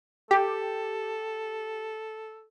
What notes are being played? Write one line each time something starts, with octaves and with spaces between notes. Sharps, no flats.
G4 A4